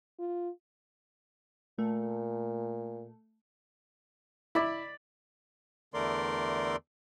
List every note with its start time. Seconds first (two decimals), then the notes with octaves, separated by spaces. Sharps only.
0.19 F4
1.79 A#2 A3
4.55 E4 D5 B5
5.94 E2 D3 A3 A#4 D5 C6